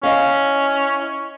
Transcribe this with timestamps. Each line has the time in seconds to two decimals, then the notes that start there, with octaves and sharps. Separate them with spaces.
0.03 C#4 E4 D#5 F5